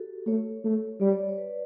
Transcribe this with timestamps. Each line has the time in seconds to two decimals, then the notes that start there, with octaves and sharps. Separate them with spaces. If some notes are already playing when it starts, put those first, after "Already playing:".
Already playing: F#4 G4 A4
0.27 A3 C#5
0.65 A3
1.00 G3 D5
1.10 C#5
1.19 D5
1.29 C#5
1.38 B4